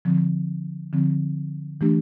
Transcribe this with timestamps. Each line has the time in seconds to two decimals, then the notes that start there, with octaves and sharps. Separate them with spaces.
0.05 D3 F3 C4
0.93 D3 F3 C4
1.81 E3 A3 D4 G4